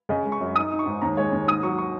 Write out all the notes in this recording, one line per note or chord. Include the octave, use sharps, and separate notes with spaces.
C#3 D#5
G#3
C#6
F#2
D#4 D#6
D#4
C#6
G#2
D#2 A#5
G#3 C#5
D#2
G#2 D#6
F#3 C#6
C#6